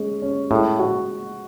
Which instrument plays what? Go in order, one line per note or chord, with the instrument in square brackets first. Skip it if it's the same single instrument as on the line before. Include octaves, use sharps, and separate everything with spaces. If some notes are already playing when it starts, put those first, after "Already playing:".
Already playing: [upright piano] G#3 C#4
C#4
[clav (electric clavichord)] A2 [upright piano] G#3
[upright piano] F#4